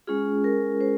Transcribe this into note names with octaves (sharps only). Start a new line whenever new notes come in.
G#3 C#4 F4 G#4
A#4
C5